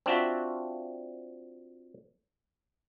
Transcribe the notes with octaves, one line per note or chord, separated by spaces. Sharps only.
C4 D4 F4 F#4 E5